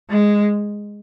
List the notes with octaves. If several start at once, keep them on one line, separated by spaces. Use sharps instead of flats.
G#3